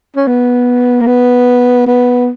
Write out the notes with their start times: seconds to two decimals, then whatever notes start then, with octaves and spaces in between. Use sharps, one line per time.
0.16 C#4
0.27 B3
1.01 A#3
1.07 B3
1.87 B3